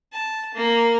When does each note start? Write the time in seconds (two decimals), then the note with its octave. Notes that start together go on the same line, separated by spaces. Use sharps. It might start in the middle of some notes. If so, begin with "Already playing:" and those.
0.13 A5
0.55 A#3